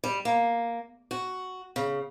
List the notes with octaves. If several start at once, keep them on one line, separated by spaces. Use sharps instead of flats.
G3
A#3
F#4
C#3